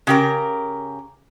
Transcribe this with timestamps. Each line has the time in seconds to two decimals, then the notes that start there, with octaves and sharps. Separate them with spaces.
0.07 C#3 G4 A#4